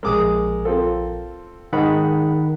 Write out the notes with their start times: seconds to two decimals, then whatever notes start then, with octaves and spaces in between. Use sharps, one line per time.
0.03 A#1 G#3 A#4 D6 D#6
0.65 C4 F4 A4
1.73 G#2 D#3 F#5 B5